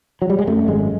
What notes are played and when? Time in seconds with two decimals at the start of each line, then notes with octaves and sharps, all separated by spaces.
0.22 F#3
0.30 G3
0.38 G#3
0.47 F#2 A3
0.68 G#1 G#3